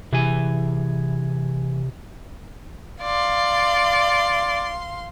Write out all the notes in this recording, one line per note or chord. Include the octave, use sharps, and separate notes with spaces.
C3 E3 G#4 G#5
D5 F5 C6